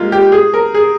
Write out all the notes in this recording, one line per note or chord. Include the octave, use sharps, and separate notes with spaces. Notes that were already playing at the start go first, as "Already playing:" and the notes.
Already playing: G3 G#3 A#3 F4
G4
G#4
A#4
G#4